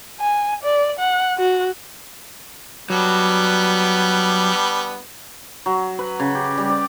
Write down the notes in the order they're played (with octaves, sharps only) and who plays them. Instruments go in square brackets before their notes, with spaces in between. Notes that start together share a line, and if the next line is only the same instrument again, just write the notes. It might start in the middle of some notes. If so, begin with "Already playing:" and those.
[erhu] G#5
D5
F#5
F#4
[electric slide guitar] F#3 [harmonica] G3 B3 D4
[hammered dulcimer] F#3
B4
C#3
G4
G3
D5